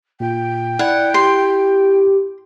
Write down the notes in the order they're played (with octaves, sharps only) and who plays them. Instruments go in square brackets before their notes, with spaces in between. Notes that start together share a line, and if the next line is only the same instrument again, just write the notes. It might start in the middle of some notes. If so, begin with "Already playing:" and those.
[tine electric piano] A#2 F4 [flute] G5
[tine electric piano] E4 B5 G#6 [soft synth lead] D5 [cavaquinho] F#5
[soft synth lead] G4 [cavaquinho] C6